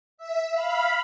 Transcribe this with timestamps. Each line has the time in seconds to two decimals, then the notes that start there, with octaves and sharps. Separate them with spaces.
0.18 E5
0.53 F5 B5